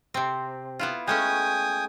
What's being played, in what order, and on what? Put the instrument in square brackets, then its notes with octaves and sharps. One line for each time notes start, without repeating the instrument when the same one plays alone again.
[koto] C3 C4
B3 E4 F4
[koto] G#3 A3 C#4 [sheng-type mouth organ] G5 G#5 D#6